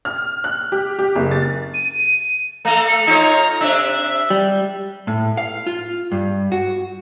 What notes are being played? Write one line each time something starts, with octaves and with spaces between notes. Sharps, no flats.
F6
F#6
G4
G4
F#1
A6
D#7
A3 A4 A#5
C#7
D#4 F4 C#5 A#5
C3 D4 E5
G3
A2
F5
F4
G2
F#4